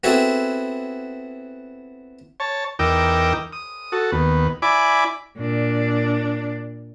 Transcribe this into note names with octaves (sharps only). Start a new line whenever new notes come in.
B3 C4 E4 F#4 G#4 A4
C#5 A5
E2 D#4 A#4 G5 D6 E6
D#6
F#4 A4
D#2 B3
E4 D5 G#5 B5 D6
A#2 D4